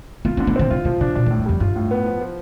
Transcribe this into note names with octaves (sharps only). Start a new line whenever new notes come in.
B3 F4
C4
D3
B3
D3 C4
C3 F4
C3 F3
C3 D4
B2 D4
D3
A2
G2
F2 G3
G2 F4
A2
B3
F3
F3